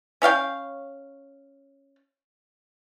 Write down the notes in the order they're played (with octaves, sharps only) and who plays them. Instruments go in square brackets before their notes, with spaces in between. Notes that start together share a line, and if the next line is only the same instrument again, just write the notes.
[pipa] C#4 C#5 F5 G5